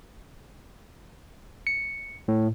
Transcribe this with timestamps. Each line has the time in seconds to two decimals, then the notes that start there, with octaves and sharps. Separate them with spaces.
1.67 C#7
2.28 A2